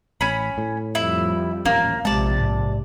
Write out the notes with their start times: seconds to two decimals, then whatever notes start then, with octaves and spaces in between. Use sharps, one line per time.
0.21 A1 C#4 B5
0.58 A2
0.95 F2 F3 G3 E4
1.65 D#1 A1 A#3 C#4
2.05 A#1 C3 G#3 D5 A5
2.41 G#2